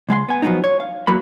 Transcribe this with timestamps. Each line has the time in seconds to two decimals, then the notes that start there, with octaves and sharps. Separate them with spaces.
0.09 C#2 G#3 F5 C6
0.29 B3 G#5
0.42 F3 F#3 G#3 B3 C4 D#4
0.64 C#5
0.80 F5
1.07 E2 E3 F#3 A#3 B5